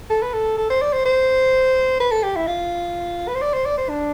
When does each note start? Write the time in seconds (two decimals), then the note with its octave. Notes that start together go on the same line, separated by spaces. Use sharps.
0.10 A4
0.22 B4
0.33 A4
0.58 A4
0.70 C5
0.82 D5
0.93 C5
1.05 C5
2.00 B4
2.11 A4
2.23 G4
2.36 E4
2.47 F4
3.28 B4
3.35 C5
3.42 D5
3.54 C5
3.66 D5
3.78 C5
3.89 D4